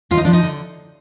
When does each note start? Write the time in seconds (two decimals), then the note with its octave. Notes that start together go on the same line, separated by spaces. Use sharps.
0.11 D#2 F4
0.17 D#4
0.25 F3 D4
0.33 D#4
0.43 D3